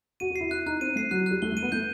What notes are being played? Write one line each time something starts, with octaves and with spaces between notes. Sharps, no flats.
F#4 D#7
F#4
E4 C7
E4 F#6
D#4 F#6
C4 D#7
A3 C7
F#3 F#6
F#3
G3 F#6
A3 G7
A3
D#7
B3
A3 G6